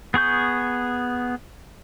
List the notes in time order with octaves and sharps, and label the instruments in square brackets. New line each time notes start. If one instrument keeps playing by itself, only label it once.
[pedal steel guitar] B3 G#4 C#6 G6